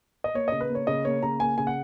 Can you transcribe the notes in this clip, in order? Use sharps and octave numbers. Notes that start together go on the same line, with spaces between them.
D#5
A#3 C#5
C#3 D#5
B4
A#3
C#5
C#3 D#5
A#3 C#5
C#3 A#5
A#3 G#5
C#3 G#5
F#5